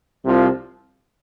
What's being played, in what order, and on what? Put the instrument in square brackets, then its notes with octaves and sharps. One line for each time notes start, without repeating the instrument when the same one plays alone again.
[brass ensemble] C2 C3 F3